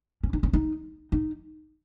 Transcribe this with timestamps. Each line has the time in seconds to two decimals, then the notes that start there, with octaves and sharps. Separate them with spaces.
0.24 C#4
0.33 D#4
0.43 C#4
0.53 D#4
1.12 D#4